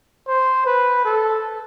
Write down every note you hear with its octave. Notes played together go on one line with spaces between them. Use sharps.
C5
B4
A4